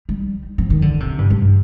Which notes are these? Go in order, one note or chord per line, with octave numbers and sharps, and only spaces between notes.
G3
F3
D#3
D3
C3
G2
G2